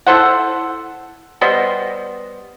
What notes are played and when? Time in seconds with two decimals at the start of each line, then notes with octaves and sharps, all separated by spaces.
0.07 E4 A4 C5 F#5
1.41 G3 B3 C5 D#5